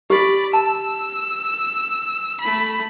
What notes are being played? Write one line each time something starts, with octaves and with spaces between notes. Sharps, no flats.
G4 D5 B5
A5 E6
A3 B5